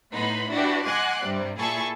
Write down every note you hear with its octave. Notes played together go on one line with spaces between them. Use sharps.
A2 B3 D#4 B5 C6
D4 E4 F#4 G4 B4 D5
D#5 F#5 G#5 C6 D6 F#6
G2 C3 G3
A#2 E4 G#4 A4 C#6